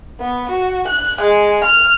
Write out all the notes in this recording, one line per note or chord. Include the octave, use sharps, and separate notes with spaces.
B3
F#4
F#6
G#3
F6